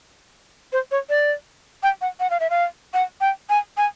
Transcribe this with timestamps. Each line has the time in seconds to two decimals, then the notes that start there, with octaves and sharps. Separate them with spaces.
0.73 C5
0.91 C#5
1.09 D5
1.83 G5
2.01 F#5
2.20 F#5
2.30 F5
2.40 E5
2.50 F5
2.94 F#5
3.21 G5
3.50 G#5
3.77 G#5